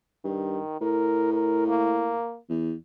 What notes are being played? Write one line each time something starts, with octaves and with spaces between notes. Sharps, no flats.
G2 D#3
A2 A#4
A#4
A#3
E2